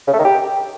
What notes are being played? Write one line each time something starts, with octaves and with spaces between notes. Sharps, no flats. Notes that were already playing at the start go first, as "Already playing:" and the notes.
C#3
A3
D#3
G4